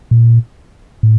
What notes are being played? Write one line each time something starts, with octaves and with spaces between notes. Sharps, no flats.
A#2
A2